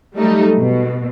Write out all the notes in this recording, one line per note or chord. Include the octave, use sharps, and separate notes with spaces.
F#3 G3 A3 D#4
B2